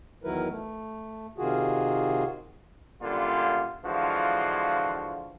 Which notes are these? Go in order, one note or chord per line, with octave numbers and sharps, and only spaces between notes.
E2 D#3 F#3 E4 A#4 B4
A3
C3 D#3 F4 F#4 G#4
F#2 A#2 D3 G3 F4
D3 E3 F3 G#3 F4 F#4